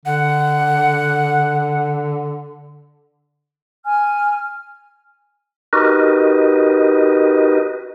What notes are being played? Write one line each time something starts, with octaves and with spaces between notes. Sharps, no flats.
D3 F#5
G#5 F6
D#4 F#4 G4 A#4 B4 D#5